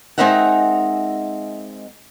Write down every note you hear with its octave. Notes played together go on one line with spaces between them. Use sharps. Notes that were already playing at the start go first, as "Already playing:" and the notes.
G#3 C4 D#4 A#4 E5 F#5